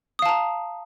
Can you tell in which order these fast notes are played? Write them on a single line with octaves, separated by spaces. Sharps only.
D#6 F5 A5 A#5